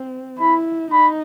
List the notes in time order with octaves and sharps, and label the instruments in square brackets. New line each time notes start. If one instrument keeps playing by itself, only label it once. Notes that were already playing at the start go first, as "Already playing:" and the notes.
Already playing: [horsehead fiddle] C4
[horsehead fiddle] E4 [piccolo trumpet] B5
[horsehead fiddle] D#4 [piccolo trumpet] B5